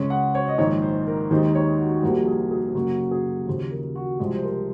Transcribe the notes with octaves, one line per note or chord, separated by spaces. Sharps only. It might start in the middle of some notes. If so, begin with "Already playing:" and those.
Already playing: C#2 C#3 G#3 C#4
F#5
C#5
D#5
A#1 G#2 D#3 C#5
C5
A#4
D#2 D#3 G#3 D#4 C5
C#5
F#4
C2 C3 F3 A#3 F#4
G#4
G#4
G#4
F#2 C#3 F#3 A#3 F#4
G#4
D#2 C#3 F3 C5
A#4
F#4
C2 C3 F3 G#3
C5
A#4